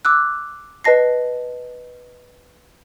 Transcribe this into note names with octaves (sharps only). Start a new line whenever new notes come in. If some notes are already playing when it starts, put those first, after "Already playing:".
D6 E6 F#6
B4 D#5 A5 A#6 C7